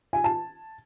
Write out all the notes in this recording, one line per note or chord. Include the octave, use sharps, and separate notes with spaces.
G#5
A5